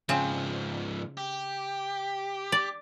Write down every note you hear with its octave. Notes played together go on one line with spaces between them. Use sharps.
G#2 C#3 F3 C4
G4
D5